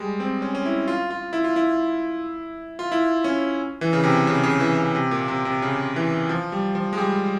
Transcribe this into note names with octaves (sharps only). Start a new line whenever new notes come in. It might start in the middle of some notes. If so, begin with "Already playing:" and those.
Already playing: G3 G#3
C4
C#4
C#4
E4
F4
F4
E4
F4
E4
F4
E4
C#4
E3
C#3
C3
C#3
C#3
E3
C#3
C3
A#2
C3
C3
C#3
E3
F3
G3
F3
G#3
G3